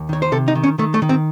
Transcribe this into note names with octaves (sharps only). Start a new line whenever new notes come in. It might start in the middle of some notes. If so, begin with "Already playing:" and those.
Already playing: D#2
D#3 C#5
C5
C3 A4
D#4
D#3
C#4
D#3 A3
A3
D#3
C4